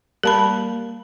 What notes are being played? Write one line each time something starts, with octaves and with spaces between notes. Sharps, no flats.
G3 A#3 A#4 A5 B5